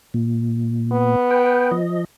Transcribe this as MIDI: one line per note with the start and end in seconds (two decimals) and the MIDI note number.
0.14 1.16 46
0.92 1.74 59
1.31 1.71 71
1.31 1.71 79
1.71 2.04 53
1.71 2.04 75